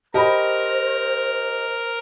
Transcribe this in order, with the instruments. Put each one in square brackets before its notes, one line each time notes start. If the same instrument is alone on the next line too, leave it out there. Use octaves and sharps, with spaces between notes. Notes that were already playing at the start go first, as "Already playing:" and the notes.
[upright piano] G4 D#5 [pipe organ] A#4 [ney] C5 [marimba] A5 B5